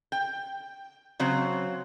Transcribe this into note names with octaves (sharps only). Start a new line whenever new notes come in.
G5
C#3 F#3 C4